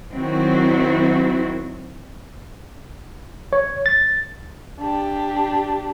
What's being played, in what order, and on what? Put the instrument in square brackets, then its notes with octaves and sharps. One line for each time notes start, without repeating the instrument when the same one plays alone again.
[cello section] D#3 F#3 C4 E4 F#4
[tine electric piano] C#5
A6
[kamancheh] D4 G4